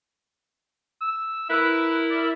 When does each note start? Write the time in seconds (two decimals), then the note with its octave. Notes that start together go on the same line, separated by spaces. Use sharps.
1.01 E6
1.50 E4 A#4 B4
2.10 D5